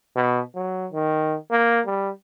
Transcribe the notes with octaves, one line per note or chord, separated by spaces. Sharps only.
B2
F#3
D#3
A#3
G3